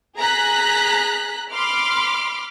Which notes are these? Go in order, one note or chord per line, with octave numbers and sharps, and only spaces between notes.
G#4 A#5 F#6 B6
B5 C6 D6 F6